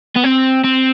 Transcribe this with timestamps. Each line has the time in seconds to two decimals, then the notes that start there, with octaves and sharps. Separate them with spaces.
0.16 B3
0.24 C4
0.64 C4